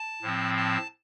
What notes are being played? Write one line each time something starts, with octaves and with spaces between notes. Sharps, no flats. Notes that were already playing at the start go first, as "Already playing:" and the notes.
Already playing: A5
A2 F3 C4
A5